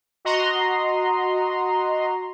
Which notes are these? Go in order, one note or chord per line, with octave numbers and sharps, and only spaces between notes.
F#4 D#5 A#5 C6